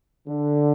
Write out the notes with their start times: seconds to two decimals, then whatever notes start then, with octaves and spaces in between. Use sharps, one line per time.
0.28 D3